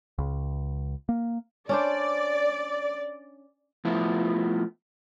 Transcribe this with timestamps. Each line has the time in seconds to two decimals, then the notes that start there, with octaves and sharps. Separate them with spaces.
0.18 C#2
1.09 A#3
1.69 C#4 D4 C5 D5
3.85 F3 A3 B3 E4 F4